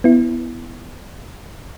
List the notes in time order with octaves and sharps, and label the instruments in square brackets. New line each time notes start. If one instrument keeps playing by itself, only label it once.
[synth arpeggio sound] B3 E4